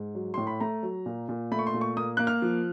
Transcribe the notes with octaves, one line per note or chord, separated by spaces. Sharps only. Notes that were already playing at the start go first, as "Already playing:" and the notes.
Already playing: G#2
F#3
A2 C6
B5
A3 A#5
F#3
A#2
A#2
A3 B5
C#6
C6
A#2
C#6
A#3 D#6
A#3 F#6
F6
F3